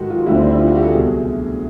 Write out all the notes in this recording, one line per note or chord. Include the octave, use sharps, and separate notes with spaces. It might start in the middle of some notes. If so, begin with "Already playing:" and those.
Already playing: G#2 D#3 F#3 F#4 G4 A4
F4
D2 D3 G3 E4
C4
D4
E4
F4
F#4
G4
A4
C2 B2 F#3 G#4